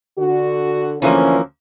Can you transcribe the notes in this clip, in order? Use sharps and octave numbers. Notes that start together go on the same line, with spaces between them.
D3 F#4
D2 E3 F3 A#3 C#4 C5